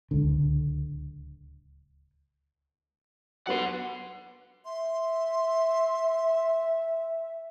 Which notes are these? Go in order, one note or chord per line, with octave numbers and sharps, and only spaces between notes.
D1 C#2 D3
F#3 B3 F#5 C6
E5 C6